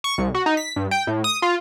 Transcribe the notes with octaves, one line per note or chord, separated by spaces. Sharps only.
C#6
C2
F#4
D#4
B6
G2
G5
A2
D#6
F4